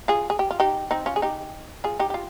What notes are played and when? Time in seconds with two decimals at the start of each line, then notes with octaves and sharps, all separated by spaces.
0.08 F4 G#4
0.30 G#4
0.39 G4
0.51 F4
0.60 D#4 G4
0.91 C4 D#4
1.06 C#4 F4
1.16 G#4
1.22 D#4 G4
1.84 F4 G#4
1.99 D#4 G4
2.10 G4
2.14 F4